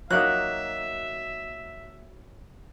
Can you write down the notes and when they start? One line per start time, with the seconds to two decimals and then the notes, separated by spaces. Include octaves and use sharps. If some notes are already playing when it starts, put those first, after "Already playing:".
0.10 F#3 A#3 D#4 E5 F#6